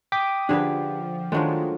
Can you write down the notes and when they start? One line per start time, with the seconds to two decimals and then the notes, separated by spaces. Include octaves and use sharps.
0.12 G5 D6 D#6 B6
0.49 D3 F3 D4 G4 G#4 B4
1.32 D#3 F3 F#3 G#3 A3 D4